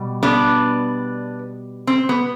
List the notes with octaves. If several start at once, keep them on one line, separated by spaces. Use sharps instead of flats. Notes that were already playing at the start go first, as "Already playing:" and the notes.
Already playing: B2 G3
B3 D4
C4
B3